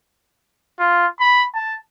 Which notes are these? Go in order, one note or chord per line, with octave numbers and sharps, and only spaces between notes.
F4
B5
A5